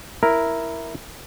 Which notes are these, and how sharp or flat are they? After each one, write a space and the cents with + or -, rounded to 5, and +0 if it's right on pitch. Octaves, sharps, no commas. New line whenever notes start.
E4 +0 A#4 +0